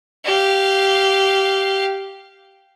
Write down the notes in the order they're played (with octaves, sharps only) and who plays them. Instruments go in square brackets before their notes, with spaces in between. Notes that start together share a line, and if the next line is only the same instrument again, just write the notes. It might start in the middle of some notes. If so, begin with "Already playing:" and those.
[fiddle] G4 F5